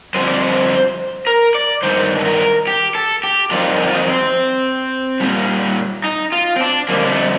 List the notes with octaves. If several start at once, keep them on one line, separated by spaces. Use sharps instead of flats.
F2 D3 G3 C5
D5
C5
A#4
D5
G2 D#3 C5
A4
A#4
G4
A4
G4
F2 D#3 G3 F4
D#4
F4
D#4
C4
A#2 G3
D#4
F4
C4
D4
F2 D3 G3 A#3
A3